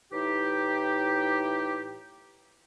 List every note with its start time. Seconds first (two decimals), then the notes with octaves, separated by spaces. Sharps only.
0.12 A2 E3 D#4 G4